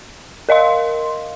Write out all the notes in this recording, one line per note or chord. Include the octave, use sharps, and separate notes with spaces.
A#4 D#5 F5 C6